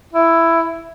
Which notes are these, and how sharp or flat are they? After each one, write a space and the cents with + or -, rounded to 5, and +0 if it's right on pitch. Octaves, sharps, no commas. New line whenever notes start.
E4 +10